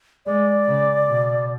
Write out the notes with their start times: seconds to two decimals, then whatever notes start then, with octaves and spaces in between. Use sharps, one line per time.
0.26 G#3 D5
0.68 C#3
1.08 B2